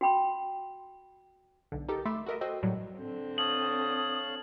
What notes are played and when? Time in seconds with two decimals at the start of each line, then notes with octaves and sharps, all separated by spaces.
0.01 F#4 G5 B5 C6
1.72 B1 D3
1.89 D#4 G4 A4 A#4
2.05 A3 E5 B5 C6 D6 E6
2.26 F#4 A4 A#4 D#5 E5
2.41 F#4 A4 C5 D#5 G5 E6
2.63 A2 F#3 G3
2.97 D3 C4
3.38 C#5 F5 A5 D#6 F#7